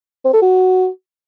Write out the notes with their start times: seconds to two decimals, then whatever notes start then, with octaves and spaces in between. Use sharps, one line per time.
0.25 C4
0.33 A4
0.42 F#4